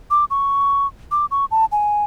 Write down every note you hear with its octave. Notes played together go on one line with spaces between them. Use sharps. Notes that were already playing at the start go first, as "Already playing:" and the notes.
D6
C#6
D6
C#6
A5
G#5